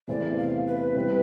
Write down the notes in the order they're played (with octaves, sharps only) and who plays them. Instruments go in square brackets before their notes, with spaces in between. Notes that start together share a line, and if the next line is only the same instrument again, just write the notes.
[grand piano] E2 C3 E3 A3 C4 [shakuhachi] D5
[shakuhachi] F5
B4
[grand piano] C3 G3 C4 E4 G4